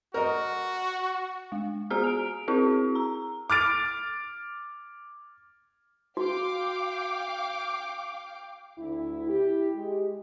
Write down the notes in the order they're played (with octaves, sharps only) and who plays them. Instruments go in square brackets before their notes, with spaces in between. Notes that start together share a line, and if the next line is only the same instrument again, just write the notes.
[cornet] F#4 [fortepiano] A#4 D#5
[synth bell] G#3
B3 F#4 G#4 A#5 F6
D7 F7
C4 E4 F#4 G#4
A#5
[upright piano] D6 F6 A6 D7
[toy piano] F#4 [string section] F5 G5 D6
[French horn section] D2 E4
E4 G4
G#3 G4